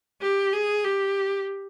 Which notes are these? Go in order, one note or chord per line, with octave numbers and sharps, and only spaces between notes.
G4
G#4
G4